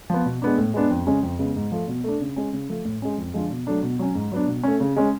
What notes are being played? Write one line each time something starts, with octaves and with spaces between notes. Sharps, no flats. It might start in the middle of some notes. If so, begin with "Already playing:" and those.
F3 B3
B2
G#3 B3 D4
A2
G#3 B3 D4
F2
C#3 G#3 C#4
F2
C#3 G#3 B3
G#2
F3 A3
B2
A3 D4
C#3
G#3 C#4
C#3
F3 A3
A2
G#3 C#4
F2
D3 F3 G#3
B2
F#3 A3 D4
B2
F#3 C#4
G#2
F#3 B3 D4
B2
A3 C#4
C#3
G#3 C#4